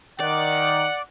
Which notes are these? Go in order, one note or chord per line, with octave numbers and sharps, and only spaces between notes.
D#3 D5 F#5